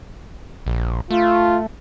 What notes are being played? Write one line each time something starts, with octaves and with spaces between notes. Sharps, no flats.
A#1
A3 F4